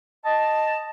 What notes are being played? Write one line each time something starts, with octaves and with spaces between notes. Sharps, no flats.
D#5 A5